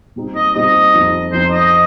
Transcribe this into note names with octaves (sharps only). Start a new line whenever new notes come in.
A#2 G3 C4 D#4
D#5
A#2 G3 C4 D#4 D#5
F2 F3 C4 D#4
F2 F3 C4 D#4 C5
D#5